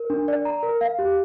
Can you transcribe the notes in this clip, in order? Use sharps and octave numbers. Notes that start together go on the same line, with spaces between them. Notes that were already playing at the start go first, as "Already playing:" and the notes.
Already playing: A#4
D4
D5
A#5
A#4
F5
G4